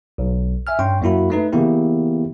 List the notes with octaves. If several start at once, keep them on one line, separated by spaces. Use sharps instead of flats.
B1
E5 G#5 F6
G2 C#4 G5 C6 C#6
F#2 A#3 E4 F#4 B5
A3 D#4 B4
C#3 E3 A#3 B3 E4 G4